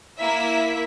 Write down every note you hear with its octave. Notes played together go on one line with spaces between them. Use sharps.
A#3 E4 E5 B6